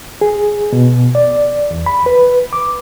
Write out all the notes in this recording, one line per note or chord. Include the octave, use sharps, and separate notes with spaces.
G#4
B2
D5
E2
B5
B4
D6